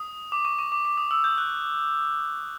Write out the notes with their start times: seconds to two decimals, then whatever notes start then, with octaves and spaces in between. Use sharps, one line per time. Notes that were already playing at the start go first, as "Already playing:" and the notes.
Already playing: D#6
0.32 D6
0.45 C#6
0.59 C#6
0.72 D6
0.85 D6
0.97 D#6
1.11 E6
1.24 G6
1.38 F#6